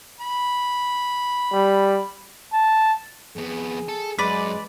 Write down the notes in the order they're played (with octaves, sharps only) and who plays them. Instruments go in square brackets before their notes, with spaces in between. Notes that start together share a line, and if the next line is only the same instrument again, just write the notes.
[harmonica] B5
[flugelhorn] G3
A5
[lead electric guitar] F2 B3 [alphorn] G#4
[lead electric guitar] A4 A5
[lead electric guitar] F#2 [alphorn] G#3 [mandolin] B4 D5